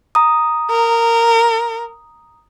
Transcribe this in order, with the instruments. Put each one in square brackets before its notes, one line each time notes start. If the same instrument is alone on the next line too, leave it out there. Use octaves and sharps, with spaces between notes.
[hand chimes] A#5 D#6
[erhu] A#4